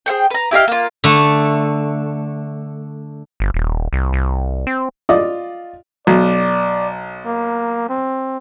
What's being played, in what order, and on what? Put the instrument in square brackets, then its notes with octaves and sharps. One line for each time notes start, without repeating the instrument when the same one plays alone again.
[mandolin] G#4 C5 F#5 G5
B4 A#5
E4 G4 D#5 F5
A#3 F4
[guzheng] D3 A3
[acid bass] G1
D#1
C2
C2
C4
[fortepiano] F4 D5 D#5
[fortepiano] B1 [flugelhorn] D5
[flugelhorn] A#3
C4